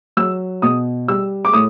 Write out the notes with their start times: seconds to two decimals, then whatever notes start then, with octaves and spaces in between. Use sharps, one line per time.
0.17 F#3 E6
0.62 B2 D#6
1.08 G3 E6
1.45 D6
1.53 A2 D#6